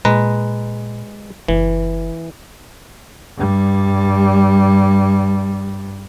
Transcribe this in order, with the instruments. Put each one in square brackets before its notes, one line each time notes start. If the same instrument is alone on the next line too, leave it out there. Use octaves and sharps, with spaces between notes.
[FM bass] A#2 [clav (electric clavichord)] G#3 B4 A#5
[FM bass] F#1 [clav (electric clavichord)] E3
[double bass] G2 G3